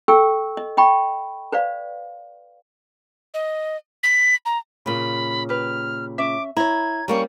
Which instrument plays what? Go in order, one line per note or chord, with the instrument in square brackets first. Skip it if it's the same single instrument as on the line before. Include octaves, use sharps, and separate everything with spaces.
[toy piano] A4 G5 C#6 E6
D#5
D#5 G5 B5 C#6
B4 C5 D5 F5
[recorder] D#5
B6
A#5
[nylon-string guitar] A#2 C#3 [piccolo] B5
[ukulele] G4 B4 [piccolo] F6
[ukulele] C#4 E5 [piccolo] D6
[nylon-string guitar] E4 [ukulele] C#5 A#5 [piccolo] G#6
[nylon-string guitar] G3 A#3 C#4 [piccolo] C#6